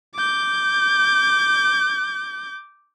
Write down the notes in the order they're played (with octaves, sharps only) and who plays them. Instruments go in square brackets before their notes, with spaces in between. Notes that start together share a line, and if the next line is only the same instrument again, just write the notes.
[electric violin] D6 G6